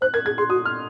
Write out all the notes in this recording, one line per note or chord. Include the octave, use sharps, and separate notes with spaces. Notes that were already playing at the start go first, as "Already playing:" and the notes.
C5 F#6
A#4 G#6
G#4 G#6
G#4 C6
F#4 D#6
F6